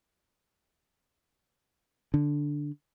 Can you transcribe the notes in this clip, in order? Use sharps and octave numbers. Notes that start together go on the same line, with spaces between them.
D3